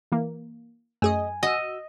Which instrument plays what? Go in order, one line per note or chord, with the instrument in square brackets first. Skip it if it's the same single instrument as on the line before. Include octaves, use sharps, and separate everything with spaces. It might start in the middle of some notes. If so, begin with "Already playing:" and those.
[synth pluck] E3 A#3
[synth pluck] F#2 [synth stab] A3 G#4 D#5 [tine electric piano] G#5
[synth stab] F#4 E6 [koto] D#5